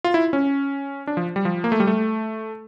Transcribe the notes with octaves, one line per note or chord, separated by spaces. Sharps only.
F4
E4
C#4
D4
F3
G3
F3
A#3
A3
G3
A3